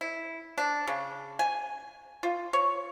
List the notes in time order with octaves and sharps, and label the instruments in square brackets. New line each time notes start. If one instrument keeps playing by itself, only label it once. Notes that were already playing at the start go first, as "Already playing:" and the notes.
[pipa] E4
D4
C#3
G#5
F4
C#5